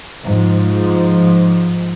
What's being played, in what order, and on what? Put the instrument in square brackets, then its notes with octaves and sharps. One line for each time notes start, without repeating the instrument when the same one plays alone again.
[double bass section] G#2 F3